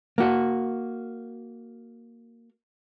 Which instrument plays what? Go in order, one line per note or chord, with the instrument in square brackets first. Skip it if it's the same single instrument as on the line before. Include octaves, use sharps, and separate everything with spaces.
[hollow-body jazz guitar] A#3 F#4